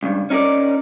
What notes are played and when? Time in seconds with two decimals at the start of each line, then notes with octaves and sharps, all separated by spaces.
0.03 C#2 G2
0.30 C#4 D#4 G4 A#4 D5